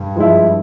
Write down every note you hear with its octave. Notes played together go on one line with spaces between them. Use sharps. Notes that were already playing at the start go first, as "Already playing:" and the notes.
Already playing: G2
F3 G#3 E4